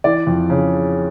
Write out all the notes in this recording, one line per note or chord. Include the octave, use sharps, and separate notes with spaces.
E3 D5
F2
C#3